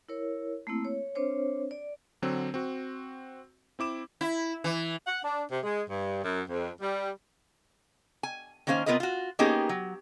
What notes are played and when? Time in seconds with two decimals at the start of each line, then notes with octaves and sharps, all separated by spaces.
0.08 E4 A#4 C#5
0.67 A3 A#3 C4 E4
0.85 C#5
1.15 C4 D4 C5 C#5
1.71 D5
2.22 D3 F#3 C4
2.54 C4 F#4
3.79 C4 E4 D6 E7
4.21 E4
4.64 E3
5.06 F#5
5.23 D4
5.50 C3
5.63 G#3
5.88 G2
6.23 F#2
6.48 F2
6.81 G3
8.23 G#5
8.67 D#3 A#3 C#4 C5 F5
8.86 C3 B3 F4 A#4 B4 D#5
9.00 F4 F#4
9.39 A#3 B3 C#4 D#4 G4 G#4
9.69 F#3